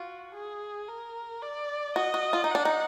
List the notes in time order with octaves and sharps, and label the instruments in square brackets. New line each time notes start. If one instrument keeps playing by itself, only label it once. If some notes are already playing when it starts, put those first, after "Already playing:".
Already playing: [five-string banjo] F4 [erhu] F#4
[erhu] G#4
A#4
D5
[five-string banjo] F#4 [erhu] D#5
[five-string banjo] F#4
F4
D#4
[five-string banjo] D4 [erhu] F#5
[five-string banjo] D#4